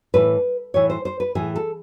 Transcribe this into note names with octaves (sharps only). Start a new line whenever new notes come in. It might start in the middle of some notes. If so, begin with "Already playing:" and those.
A2 E3 B4
A2 E3 C#5
C5
C5
B4
A2 E3 G#4
A4